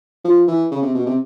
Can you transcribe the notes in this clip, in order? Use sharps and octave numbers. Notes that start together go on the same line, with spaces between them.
F3
E3
C#3
C3
B2
C3